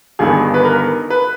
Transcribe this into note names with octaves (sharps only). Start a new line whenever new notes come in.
G1 G2 D#3 G#4
B4
A#4
B4